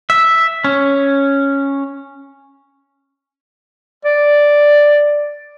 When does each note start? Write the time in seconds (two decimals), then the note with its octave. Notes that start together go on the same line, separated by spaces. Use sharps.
0.10 E5
0.64 C#4
4.05 D5